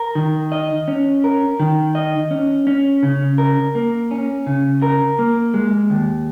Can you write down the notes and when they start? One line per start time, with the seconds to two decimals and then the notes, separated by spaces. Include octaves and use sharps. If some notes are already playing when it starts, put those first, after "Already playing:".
Already playing: A#4
0.15 D#3
0.52 D#5
0.88 C#4
1.24 A#4
1.60 D#3
1.95 D#5
2.31 C#4
2.67 C#4
3.03 C#3
3.38 A#4
3.75 A#3
4.11 C#4
4.47 C#3
4.82 A#4
5.19 A#3
5.54 G#3
5.90 D#2